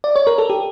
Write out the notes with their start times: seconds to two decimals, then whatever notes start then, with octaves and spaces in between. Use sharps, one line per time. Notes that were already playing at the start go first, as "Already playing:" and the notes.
0.04 D5
0.16 C#5
0.27 A#4
0.38 A4
0.50 G4